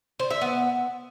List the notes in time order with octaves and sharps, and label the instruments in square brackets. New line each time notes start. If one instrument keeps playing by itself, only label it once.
[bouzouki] C5
E5
B3